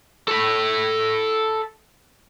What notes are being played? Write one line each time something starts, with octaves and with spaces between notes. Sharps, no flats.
A4 B5